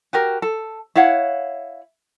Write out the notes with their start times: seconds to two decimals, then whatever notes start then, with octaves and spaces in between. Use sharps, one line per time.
0.13 F#4 G4 A#4
0.42 A4
0.96 E4 C#5 F5 F#5